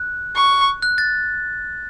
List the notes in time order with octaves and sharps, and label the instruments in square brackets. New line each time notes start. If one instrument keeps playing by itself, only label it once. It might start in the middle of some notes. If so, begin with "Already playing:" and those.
Already playing: [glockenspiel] F#6
[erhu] C#6
[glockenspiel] F#6
A6